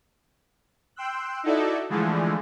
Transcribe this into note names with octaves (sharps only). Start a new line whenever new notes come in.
G5 C6 E6 F#6
D#4 E4 F#4 A4 D5 E5
D3 E3 F3 G#3 A3